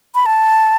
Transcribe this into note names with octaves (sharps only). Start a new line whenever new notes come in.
B5
A5